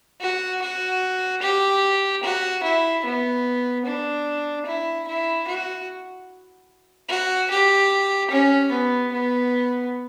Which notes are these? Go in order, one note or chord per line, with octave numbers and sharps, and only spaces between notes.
F#4
F#4
G4
F#4
E4
B3
D4
E4
E4
F#4
F#4
G4
C#4
B3
B3